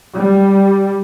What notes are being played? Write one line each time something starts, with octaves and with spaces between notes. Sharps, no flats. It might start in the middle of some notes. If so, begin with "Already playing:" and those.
G3